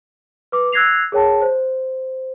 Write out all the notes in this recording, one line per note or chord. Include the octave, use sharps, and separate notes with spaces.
B4 D6
E6 F#6 G#6 A#6 C7 F7
G#4 A#4 C#5 G5 A5
C5